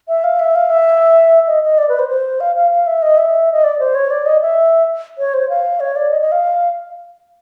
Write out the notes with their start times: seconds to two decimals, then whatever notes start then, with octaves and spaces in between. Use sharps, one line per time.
0.08 E5
0.24 F5
0.39 E5
0.55 F5
0.70 E5
1.47 D#5
1.63 D#5
1.78 D5
1.89 B4
1.99 C5
2.09 C5
2.40 F5
2.56 F5
2.71 F5
2.87 E5
3.02 D#5
3.17 E5
3.52 D#5
3.64 D5
3.80 C5
3.95 C#5
4.11 D5
4.26 D#5
4.41 E5
5.18 C#5
5.34 C5
5.49 F5
5.80 C#5
5.96 D5
6.11 D#5
6.21 D#5
6.32 F5